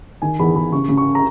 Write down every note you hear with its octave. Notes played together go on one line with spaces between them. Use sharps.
D#3 G#5
E2 B5
E2 B5
C#3 C#6
C#3
C#6
A#5